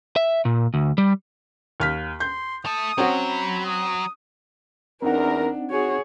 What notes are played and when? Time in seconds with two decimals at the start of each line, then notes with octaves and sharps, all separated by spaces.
0.16 E5
0.45 A#2
0.74 D2
0.98 G3
1.80 D#2 F6 B6
2.20 C6 G6
2.65 A3 A4 D#6
2.98 F#3 C4 C#4 F#4
3.28 B5
3.65 D#6
5.02 E2 C4 D4 D#4 A#4 F#5
5.70 F#4 G#4 C#5